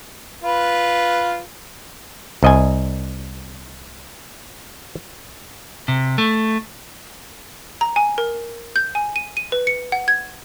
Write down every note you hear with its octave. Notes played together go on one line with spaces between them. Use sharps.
F4 B4
C2 D#5 G#5
C3
A3
A#5
G#5
A#4
G6
G#5
D#7
D#7
B4
C#7
F#5
G#6